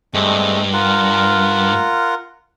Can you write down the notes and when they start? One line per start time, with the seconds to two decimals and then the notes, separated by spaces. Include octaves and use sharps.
0.14 G2 G#3 A3 C4
0.73 F4 A#4 F#5